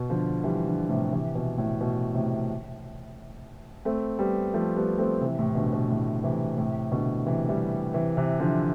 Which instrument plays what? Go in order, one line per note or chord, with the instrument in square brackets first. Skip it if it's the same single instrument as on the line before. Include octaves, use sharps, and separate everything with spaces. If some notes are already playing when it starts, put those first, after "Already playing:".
Already playing: [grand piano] B2
D3 F3
E3 G3
D3 F3
A2 C3
C3 E3
B2
A2
B2
A2 C3
A3 C4
G3 B3
F3 A3
G3 B3
A3 C4
C3 E3
A2 C3
B2 D3
B2
A2 C3
C3 E3
A2 C3
B2 D3
C3 E3
E3 G3
C3 E3
C3 E3
D3 F3